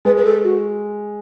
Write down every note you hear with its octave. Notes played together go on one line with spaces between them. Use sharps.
G#3 B4
B4
A4
F#4